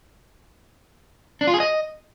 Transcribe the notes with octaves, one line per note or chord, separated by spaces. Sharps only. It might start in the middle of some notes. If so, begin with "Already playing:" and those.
D4
F4
G#4
D#5